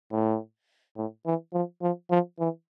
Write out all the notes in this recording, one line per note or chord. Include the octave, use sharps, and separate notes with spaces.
A2
A2
E3
F3
F3
F3
E3